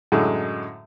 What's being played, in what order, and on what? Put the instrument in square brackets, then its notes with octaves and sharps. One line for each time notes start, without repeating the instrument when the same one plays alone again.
[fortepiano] F#2 A2 D3 F#3 G#3